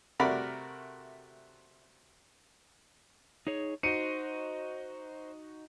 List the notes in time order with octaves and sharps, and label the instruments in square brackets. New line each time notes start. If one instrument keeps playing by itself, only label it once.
[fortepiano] C3 A3 F#4 A#4 D5 B5
[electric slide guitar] D#4 G#4 C#5
[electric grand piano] D#4 F#4 D#5 [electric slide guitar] C5 [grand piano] C#7 D#7